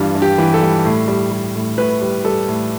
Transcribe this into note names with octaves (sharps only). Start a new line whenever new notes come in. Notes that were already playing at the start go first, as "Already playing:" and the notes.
Already playing: G2 E3 G3 F4
G2
G4
E3
A4
G3
A2
G3
G3
A2
A2 B4
G3
G3 A4
A2